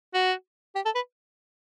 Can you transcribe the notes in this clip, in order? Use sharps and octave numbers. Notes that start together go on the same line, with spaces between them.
F#4
G4
A4
B4